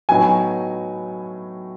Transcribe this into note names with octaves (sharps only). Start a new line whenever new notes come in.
A2 F#3 B3 D#4 G#5